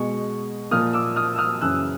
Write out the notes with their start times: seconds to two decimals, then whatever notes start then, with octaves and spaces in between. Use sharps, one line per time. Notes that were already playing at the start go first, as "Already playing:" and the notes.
Already playing: B2 G#3 C#6
0.71 A#2 F3 A#3 D#6 F6
0.93 D6 E6
1.16 D#6 F6
1.35 E6
1.38 D#6 F6
1.61 F#2 C#3 E3 E6 F#6